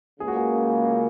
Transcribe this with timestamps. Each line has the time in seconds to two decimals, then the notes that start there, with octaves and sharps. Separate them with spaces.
0.20 C#2 C#3 A#3 G#4
0.28 F#4
0.37 G#4